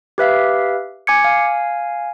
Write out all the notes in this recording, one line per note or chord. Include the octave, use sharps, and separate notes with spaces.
G4 B4 E5 F5
G#5 D6 G#6 C#7
F5 G#5